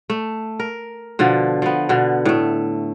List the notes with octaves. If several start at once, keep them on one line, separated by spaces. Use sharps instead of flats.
A3
A#4
B2 D3 F3
F3 B3
B2 D3
A2 A3